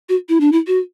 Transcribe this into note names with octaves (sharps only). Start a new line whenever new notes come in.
F#4
E4
D4
E4
F#4